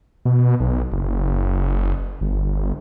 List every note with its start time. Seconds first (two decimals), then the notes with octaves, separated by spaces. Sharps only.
0.25 B2
0.60 B1
0.92 F#1
2.21 G1